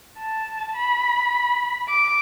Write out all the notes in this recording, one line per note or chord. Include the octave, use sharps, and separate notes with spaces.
A5
B5
D6